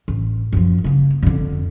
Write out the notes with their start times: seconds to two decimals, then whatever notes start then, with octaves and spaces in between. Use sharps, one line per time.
0.08 A1
0.53 F#2 F3
0.84 C#3 A#3
1.23 F2 D3